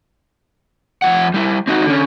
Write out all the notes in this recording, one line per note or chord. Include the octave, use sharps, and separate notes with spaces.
F2 D#3 F3 F#5
G3 E4
C4 D#4 F#4
D3 C#4